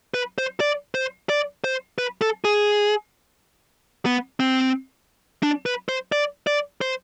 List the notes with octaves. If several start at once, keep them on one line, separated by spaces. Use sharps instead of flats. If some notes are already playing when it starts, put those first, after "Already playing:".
B4
C5
D5
C5
D5
C5
B4
A4
G#4
B3
C4
D4
B4
C5
D5
D5
C5